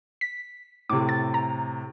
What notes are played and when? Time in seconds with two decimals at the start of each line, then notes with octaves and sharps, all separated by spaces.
0.21 B6
0.90 A2 C3 D6
1.09 A6
1.34 A#5